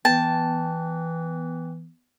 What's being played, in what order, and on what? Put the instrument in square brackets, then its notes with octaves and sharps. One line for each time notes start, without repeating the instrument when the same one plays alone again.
[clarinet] E3 [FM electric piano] B3 [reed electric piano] G5 [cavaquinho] A5